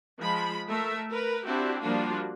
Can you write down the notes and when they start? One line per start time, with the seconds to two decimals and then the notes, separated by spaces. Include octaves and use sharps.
0.20 F3 G#3 B5
0.68 A3 A#4 E5
1.10 A#4 B4
1.46 C4 D4 E4 F#4 G4
1.81 F3 G3 A#3 D4 F4 F#4